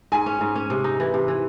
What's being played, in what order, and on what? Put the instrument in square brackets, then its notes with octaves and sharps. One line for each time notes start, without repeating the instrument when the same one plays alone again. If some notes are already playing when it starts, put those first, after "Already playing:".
[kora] G#2 [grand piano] G#5
[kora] C#4
G#2
C#4
C3
D#4
E3
C3
E3